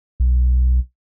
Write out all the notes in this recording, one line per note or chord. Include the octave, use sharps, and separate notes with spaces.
B1